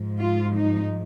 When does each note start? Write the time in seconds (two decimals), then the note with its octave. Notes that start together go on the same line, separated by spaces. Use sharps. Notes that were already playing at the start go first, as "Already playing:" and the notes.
Already playing: G#2 F3
0.21 F4
0.55 D#4